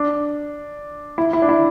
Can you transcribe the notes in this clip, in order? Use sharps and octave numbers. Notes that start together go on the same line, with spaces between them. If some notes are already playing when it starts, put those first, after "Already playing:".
Already playing: D4
E4
E4
D4
E4